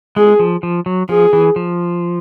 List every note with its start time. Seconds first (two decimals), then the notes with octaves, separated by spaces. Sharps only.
0.16 G#3 G#4
0.40 F3
0.63 F3
0.86 F#3
1.09 F3 G#4
1.33 E3
1.56 F3